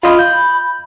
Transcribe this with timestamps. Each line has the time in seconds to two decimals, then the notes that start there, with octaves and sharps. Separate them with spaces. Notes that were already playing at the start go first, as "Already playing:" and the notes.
0.03 F4 D#5 F5 B5
0.19 G6